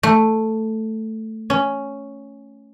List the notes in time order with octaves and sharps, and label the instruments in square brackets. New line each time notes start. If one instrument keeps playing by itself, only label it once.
[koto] A3
C#4